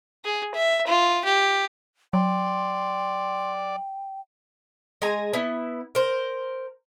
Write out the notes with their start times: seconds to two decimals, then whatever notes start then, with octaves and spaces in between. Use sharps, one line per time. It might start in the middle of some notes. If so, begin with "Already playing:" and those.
0.25 G#4
0.54 E5
0.87 F4
1.25 G4
2.13 F#3 D5 G5 C6
5.02 G#3 G#5 A#5
5.33 B3 E4
5.95 A#4 C5